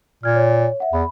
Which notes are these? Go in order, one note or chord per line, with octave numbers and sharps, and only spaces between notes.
A#2 F6 G#6
C#5
E5 F#5
E2 B5